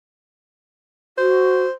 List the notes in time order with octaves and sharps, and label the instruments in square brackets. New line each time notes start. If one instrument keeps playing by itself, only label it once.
[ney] F#4 [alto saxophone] C5